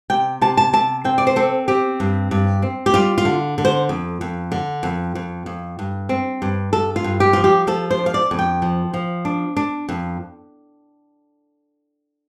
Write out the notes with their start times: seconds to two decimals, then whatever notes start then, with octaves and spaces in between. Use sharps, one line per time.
0.10 C3 G5
0.41 C3 A5
0.57 A5
0.73 C3 A5
1.04 C4 G5
1.18 D5
1.27 C5
1.36 C4 A4
1.68 C4 G4
2.00 G2
2.31 G2
2.62 C4
2.86 G4
2.94 G3 F4
3.18 F4
3.25 D3
3.58 D3
3.65 C5
3.89 F2
4.21 F2
4.52 D3
4.83 F2
5.15 F2
5.46 F2
5.79 G2
6.09 C4
6.42 G2
6.73 G2 A4
6.96 F4
7.04 G2
7.20 G4
7.33 F3 F4
7.44 G4
7.67 F3 A4
7.91 C5
7.98 D4
8.06 F5
8.14 D5
8.31 F2
8.39 G5
8.62 F3
8.94 F3
9.25 D4
9.57 D4
9.89 F2